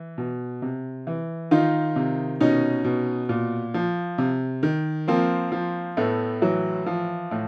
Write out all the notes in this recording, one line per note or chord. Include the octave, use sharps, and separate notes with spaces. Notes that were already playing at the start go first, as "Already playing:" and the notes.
Already playing: E3
B2
C3
E3
D#3 D#4 F4
C3
B2 C#4 D#4
B2
A#2
F3
C3
D#3
F3 A#3 C4
F3
A2 A3 B3
E3 F#3
F3
A2